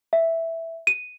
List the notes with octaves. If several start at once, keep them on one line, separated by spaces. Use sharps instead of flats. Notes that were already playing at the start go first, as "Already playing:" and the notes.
E5
D#7